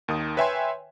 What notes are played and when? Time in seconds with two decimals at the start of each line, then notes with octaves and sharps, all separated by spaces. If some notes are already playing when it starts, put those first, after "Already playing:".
0.08 D#2 D#3 D#6
0.37 B4 C#5 E5 G5 G#5 C6